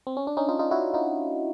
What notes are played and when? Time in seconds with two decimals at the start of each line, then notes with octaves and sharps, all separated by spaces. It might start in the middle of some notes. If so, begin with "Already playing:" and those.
0.07 C4
0.17 C#4
0.27 D4
0.37 C#4 D#4
0.49 D#4 F4
0.59 D#4 F4
0.71 E4 F#4
0.94 D#4 F4